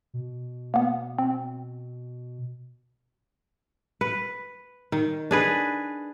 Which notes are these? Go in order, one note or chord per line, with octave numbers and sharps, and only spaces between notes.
B2
A#3 B3
C4
B4
D#3
D4 G#4 B4